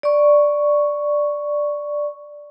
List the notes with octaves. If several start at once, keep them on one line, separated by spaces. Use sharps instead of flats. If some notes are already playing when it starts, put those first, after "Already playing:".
D5 C#6